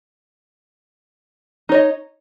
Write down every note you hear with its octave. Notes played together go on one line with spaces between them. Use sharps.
D#4 C#5 D#5